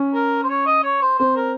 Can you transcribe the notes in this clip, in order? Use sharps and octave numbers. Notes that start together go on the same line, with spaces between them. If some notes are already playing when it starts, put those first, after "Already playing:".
Already playing: C#4
A#4
C5
C#5
D#5
C#5
C5
C4 C5
A#4